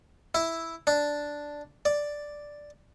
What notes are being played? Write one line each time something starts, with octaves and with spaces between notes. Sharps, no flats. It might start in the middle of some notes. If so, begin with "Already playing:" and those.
E4
D4
D5